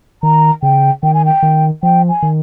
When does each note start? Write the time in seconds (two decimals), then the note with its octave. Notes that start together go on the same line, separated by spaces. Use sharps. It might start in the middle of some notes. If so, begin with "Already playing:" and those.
0.23 D#3 A#5
0.63 C#3 G5
1.03 D#3 G5
1.14 G#5
1.25 G5
1.43 D#3
1.83 F3 G5
2.09 G#5
2.22 D#3